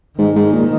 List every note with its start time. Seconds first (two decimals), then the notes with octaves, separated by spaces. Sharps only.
0.19 G#2 D#3
0.36 G#2
0.53 A#2